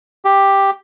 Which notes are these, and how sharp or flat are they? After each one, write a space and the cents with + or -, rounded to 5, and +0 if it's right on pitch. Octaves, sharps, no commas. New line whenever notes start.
G4 +5